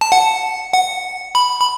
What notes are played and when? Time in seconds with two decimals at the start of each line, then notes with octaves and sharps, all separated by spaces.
0.01 A5
0.12 F#5
0.73 F#5
1.35 B5
1.60 B5